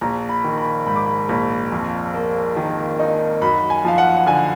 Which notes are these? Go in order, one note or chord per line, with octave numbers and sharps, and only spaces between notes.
A#1 A#5
B5
D#3
B5
G#2 B5
D6
B5
A#1 B5
F2
A#3
D#3
D#4
F#2 B5
G#5
F3 F5
F#5
F#5
D3 G#5